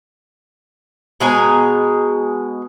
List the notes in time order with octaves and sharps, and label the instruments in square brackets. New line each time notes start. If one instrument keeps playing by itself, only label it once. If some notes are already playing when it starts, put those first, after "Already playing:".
[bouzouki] B2 G#3 G#5 A#5